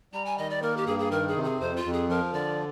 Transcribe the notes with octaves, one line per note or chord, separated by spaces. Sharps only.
G3 A#5
G#5
D#3 D#5
D5
A#3 A#4
G4
G2 G#4
G#4
D#3 A#4
G#4
C3
G#4
F2 C5
F4
F2
G#4
F3 A#4
D3 D5